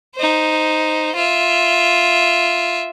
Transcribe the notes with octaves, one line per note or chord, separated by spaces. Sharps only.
D#4 C5
F4 E5